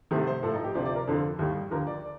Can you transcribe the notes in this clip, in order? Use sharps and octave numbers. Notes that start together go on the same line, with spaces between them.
C2 C3 D#3 A3
C5
A2 F3 A3 A4
D#4
G4
D2 C3 F3 D5
D5
A#4
F2 D3 F3 A4
D#2 D#3 G3
D#2 D3 F3 A#4
D5